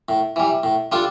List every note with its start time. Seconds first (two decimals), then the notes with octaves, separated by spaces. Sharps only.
0.09 A2
0.36 E3 G3
0.63 A2
0.92 G3 D4 F4 A4